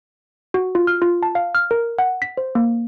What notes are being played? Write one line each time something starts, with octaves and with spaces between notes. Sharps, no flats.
F#4
F4
F6
F4
A5
F5
F6
A#4
F#5
B6
C5
A#3